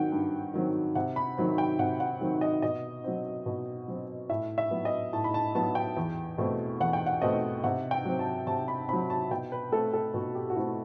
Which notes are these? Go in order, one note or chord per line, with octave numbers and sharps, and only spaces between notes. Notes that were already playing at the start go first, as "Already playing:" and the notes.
Already playing: D#3 F#3 C4 F#5 G5
G2
D#3 F#3 C4
C3 F#5
B5
D#3 F#3 C4
G5
C3 F#5
F#5
D#3 F#3 C4
D#5
B2 D#5
F#3 C4
B2
F#3 C4
A2 E5
E5
F#3 B3
D#5
A2 A5
B5
A5
F#3 B3 A5
G5
E2
B2 A3 C4
E2 F#5
G5
F#5
B2 A3 C4 D#5
C3 F#5
G5
F#3 C4
A5
C3 A5
B5
F#3 C4 B5
A5
B2 G5
B4
A3 C4 A4
A4
B2 F#4
G4
F#4
A3 C4 E4